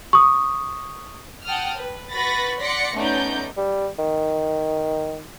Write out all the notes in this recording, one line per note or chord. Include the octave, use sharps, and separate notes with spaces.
C#6 D#6
F#5 G5 A5 D#6 F6
B4
F#4 B4 B5 C#6 A6 A#6
D5 F#5 C6 A#6 B6 C#7
A3 B3 C#4 D#4 D5 G6
G3
D#3